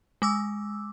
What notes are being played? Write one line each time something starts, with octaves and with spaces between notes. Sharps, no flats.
G#3 D6 E6